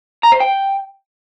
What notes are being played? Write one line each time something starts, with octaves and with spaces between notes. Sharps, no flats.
A#5
C5
G5